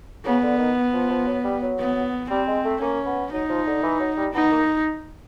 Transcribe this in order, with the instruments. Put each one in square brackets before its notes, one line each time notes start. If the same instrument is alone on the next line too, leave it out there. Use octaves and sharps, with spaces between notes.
[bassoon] C#3 [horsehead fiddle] B3
[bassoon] D3
D#3
F3
F3
F#3
G3
F#3
[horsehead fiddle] B3
[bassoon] G3 [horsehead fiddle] C4
[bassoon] G#3
A3
[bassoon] A#3 [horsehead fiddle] C#4
[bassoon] B3
[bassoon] F#3 [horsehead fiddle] D#4
[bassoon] F3
D3
E3
F#3
G3
[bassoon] B3 [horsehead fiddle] D#4
[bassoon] A#3